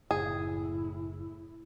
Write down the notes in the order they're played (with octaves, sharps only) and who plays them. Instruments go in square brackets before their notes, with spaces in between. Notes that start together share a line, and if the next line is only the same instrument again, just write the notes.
[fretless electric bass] F#1 [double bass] A2 E4 [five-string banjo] G#4